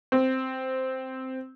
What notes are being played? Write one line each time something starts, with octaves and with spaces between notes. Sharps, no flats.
C4